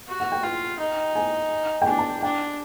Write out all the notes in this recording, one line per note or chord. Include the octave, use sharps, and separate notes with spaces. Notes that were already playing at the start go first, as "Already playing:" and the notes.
F#4
F#5
G5
F4 G5
D#4
G#5
G5
D4 G#5
A5
D4 G5